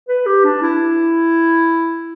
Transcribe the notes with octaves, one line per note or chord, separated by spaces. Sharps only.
B4
G4
D4
E4